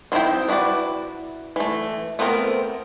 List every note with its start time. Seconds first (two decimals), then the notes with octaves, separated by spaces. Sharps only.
0.12 D#3 C4 D#4 E4 G5
0.48 D4 E4 F#4 B4 D5
1.56 E3 A3
2.19 A3 B3 C4 D4 A#4